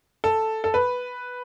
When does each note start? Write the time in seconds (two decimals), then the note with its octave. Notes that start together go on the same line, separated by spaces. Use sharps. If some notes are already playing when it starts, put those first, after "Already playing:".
0.24 A4
0.64 A4
0.74 B4